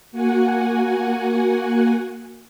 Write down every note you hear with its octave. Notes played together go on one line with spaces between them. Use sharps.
A#3 F#4 F#5 G#5